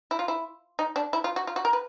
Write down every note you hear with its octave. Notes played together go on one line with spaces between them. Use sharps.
E4
F4
E4
D#4
D4
E4
F4
F#4
F4
F#4
A#4
B4